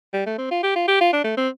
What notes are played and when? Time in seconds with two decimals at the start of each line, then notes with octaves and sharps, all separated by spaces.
0.13 G3
0.26 A3
0.38 C4
0.51 F4
0.63 G4
0.75 F4
0.88 G4
1.01 F4
1.13 D4
1.24 A3
1.37 C4